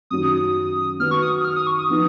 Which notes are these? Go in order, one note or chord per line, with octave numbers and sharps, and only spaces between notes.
F#2 D#3 F#3 D#6
D#3 F#3 B3 D#4 F6
C#6
D#6
D#6
F6
D#6
C#6
D#6
F3 B3 D#4